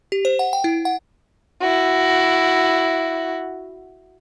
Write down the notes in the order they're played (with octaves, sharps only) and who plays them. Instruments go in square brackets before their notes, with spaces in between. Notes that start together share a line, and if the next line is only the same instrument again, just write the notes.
[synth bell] G4
C5
F#5
G5
E4
F#5
[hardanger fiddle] E4 F#4